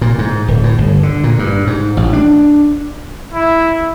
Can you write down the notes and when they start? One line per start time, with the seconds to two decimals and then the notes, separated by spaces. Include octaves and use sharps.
0.01 A#2
0.18 G#2
0.48 D1
0.64 A2
0.78 G1
1.03 D3
1.24 A#2
1.39 G2
1.67 G#2
1.97 A1
2.13 D4
3.34 E4